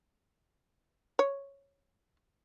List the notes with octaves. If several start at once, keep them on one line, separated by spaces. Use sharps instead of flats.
C#5